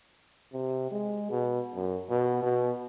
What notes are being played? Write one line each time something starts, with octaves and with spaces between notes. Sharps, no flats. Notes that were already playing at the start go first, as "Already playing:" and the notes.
C3
G#3
B2
F#2
B2
B2